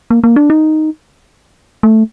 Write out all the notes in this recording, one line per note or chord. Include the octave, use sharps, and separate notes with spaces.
A#3
A#3
D4
D#4
A3